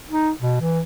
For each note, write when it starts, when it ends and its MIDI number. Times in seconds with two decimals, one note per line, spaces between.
0.10 0.31 63
0.41 0.57 47
0.61 0.80 52